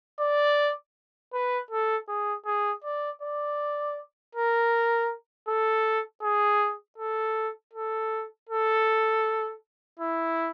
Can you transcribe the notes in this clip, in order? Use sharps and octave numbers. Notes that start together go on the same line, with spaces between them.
D5
B4
A4
G#4
G#4
D5
D5
A#4
A4
G#4
A4
A4
A4
E4